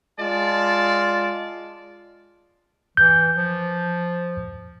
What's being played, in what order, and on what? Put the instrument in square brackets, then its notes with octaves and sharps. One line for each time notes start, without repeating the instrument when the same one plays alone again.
[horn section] G#3 F4 D5 A5
[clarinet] E3 [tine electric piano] G6
[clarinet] F3